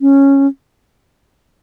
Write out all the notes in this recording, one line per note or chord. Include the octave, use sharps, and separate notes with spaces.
C#4